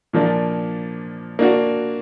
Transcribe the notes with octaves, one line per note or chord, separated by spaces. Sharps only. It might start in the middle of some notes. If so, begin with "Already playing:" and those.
A#2 F3 A#3 D4
A#3 D4 F#4